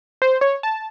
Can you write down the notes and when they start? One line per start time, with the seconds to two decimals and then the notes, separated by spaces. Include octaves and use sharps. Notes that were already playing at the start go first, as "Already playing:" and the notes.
0.22 C5
0.41 C#5
0.63 A5